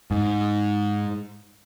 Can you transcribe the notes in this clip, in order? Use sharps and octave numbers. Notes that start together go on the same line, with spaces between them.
G#2